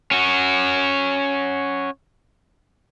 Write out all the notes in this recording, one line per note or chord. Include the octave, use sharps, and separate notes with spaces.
C#4 F#4